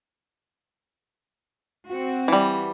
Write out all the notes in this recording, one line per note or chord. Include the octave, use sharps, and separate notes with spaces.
C4 F#4
E3 G3